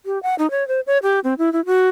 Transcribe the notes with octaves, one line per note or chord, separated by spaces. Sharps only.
G4
F#5
D#4
C#5
C5
C#5
G4
C4
E4
E4
F#4